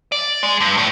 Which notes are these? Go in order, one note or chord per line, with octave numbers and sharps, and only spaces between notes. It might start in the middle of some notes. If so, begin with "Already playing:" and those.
D5
G#3
G2
A2